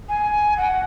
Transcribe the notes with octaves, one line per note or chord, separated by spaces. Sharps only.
G#5
F#5